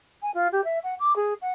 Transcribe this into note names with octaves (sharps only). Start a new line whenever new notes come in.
G#5
F4
G4
E5
F#5
D6
G#4
F#5